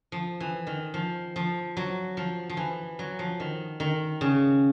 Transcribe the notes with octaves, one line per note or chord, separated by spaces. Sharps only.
F3
E3
D#3
F3
F3
F#3
F3
F3
E3
F#3
F3
D#3
D#3
C#3